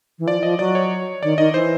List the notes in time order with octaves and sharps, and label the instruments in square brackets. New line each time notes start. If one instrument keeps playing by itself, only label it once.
[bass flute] E3
[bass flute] F3 [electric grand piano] D5
[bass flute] F3 [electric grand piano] D#5
[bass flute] F#3 [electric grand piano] D5
[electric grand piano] C#5
[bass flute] D#3 [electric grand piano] D5
[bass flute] D#3 [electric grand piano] D#5
[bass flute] E3 [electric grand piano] C5